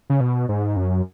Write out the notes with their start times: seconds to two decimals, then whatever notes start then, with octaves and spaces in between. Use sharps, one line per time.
0.10 C#3
0.20 B2
0.49 G#2
0.76 F#2